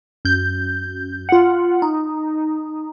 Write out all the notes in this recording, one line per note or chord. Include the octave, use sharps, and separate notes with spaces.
F#2 G6
F4 F#5
D#4